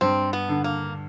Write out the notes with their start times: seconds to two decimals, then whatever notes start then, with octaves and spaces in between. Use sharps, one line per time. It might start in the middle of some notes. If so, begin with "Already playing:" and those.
0.01 G2 C4
0.33 B3
0.49 D3
0.64 A#3